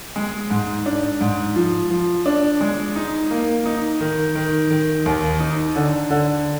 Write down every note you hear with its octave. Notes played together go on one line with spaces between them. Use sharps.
G#3
G#2
D4
G#2
F3
F3
D4
G#3
D#4
A#3
D#4
D#3
D#3
D#3
D#2
D#4
D3
D3